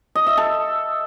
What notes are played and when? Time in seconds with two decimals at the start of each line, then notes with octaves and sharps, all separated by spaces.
0.15 D#5
0.26 E5
0.37 A4